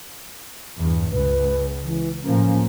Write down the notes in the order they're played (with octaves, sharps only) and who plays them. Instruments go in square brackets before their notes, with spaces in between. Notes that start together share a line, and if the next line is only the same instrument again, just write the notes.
[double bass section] E2 G2
[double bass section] C#2 [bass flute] B4
[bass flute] E3
[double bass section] A2 F3 A#3 [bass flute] C#4